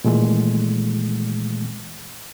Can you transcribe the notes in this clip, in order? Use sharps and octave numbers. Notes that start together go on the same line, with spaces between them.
A#2 D#3 E3 G#3 A3